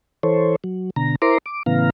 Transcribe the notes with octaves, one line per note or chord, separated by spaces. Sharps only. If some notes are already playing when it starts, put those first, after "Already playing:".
E3 A4 C5 C#5
F#3
B2 D3 A#5
E4 A#4 C5 A#5 C6 D6
D6
A2 C#3 E3 B3 F5 A#5